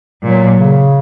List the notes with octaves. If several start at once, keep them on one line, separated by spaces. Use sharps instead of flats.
A#2 F#3
C#3